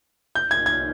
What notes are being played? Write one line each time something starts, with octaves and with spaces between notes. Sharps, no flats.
G6
G#6
G#6